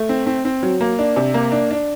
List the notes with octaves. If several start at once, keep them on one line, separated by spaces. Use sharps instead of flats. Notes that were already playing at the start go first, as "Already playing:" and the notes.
Already playing: A3
C4
C4
C4
F#3
A#3
D4
C3
A#3
D4
D4